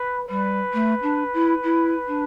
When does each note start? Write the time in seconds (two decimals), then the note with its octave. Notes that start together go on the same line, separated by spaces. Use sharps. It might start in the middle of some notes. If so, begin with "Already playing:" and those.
Already playing: B4
0.29 G3 B4
0.74 A3
1.03 D4
1.33 E4
1.63 E4
2.08 D4